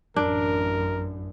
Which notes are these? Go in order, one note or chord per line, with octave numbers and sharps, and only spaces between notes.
A1 F#2 D4 A#4